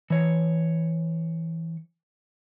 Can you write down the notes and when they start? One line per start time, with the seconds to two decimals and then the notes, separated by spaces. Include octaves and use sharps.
0.10 E3 C#5